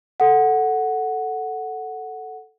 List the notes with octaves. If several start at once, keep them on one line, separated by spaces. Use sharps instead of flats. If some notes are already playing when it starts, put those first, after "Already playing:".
A4 F#5